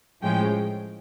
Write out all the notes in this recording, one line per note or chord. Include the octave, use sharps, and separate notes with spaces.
A2 F3 G#3 C#4 G5